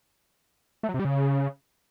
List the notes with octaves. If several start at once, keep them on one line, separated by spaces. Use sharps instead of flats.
A3
F#3
C3
G3
C#3